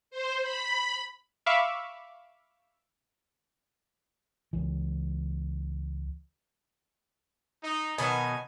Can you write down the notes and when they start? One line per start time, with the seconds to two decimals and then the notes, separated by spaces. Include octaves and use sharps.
0.11 C5
0.42 B5
1.46 E5 F5 B5 C#6 D6 E6
4.53 C#2 E3
7.63 D#4
7.98 B2 D#3 F#3 B3 G#5 A5